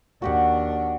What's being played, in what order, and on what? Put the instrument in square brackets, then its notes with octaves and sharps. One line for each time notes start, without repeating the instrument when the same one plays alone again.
[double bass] D#2 D4 [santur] F#4 G4 F#5